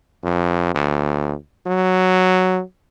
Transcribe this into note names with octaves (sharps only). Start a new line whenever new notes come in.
F2
D2
F#3